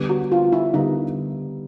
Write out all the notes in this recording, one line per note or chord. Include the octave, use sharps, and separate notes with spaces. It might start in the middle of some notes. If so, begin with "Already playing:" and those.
Already playing: D3 G3 B3
F#4
F4
E4
D3 G3 B3 D#4